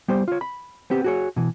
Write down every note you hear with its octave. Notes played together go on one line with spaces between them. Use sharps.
G3 B3 G4 C5
F4 C#5
B5
B3 C4 G4
F#4 G#4 C#5
B2 E3